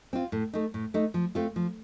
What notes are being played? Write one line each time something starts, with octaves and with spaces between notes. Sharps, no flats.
C4 F4
A2
A3 D#4
A2
A3 D#4
F3
A3 C4 F4
F3